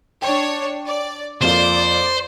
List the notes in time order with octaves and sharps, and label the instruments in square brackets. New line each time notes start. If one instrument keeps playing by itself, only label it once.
[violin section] D4 C#5 [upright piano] G5
[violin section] D5
[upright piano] F2 A#3 F4 [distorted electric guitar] C5 [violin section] D5